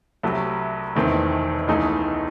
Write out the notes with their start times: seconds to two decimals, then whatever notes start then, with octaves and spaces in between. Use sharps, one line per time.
0.23 C2 C3 F#3 A3
0.96 E1 E2 D#3 A3 C4
1.67 C#2 C#3 E3 A3 D#4